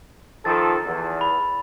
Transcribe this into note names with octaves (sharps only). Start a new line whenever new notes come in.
D#3 F3 A4 A6
E2
B5